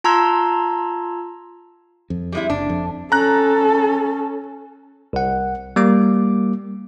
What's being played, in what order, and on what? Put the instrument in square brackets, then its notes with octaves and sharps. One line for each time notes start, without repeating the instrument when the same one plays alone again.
[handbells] F4 A5 A#5 C6 E6 G#6
[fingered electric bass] F2
[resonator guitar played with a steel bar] G3 G#3 E4
[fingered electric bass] F#1 [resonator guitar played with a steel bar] D4
[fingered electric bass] F2
[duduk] C#4 [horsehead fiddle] A4 [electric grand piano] A#5 F#6
[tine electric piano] C2 F#5
G3 A#3 D6